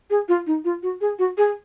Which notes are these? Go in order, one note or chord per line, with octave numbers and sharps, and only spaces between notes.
G#4
F4
D#4
F4
F#4
G#4
F#4
G#4